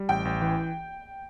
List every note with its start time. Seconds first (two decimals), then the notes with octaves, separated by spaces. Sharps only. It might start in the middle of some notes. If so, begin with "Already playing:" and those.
Already playing: G3
0.09 A1 G5
0.25 A1
0.42 E3